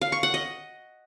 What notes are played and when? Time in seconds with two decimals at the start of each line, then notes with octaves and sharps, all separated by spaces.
0.01 F5
0.12 C#6
0.23 F#5
0.34 D#5